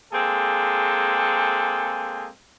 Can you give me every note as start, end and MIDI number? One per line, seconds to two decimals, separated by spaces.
0.12 2.28 56
0.12 2.28 58
0.12 2.28 60
0.12 2.28 68
0.12 2.28 69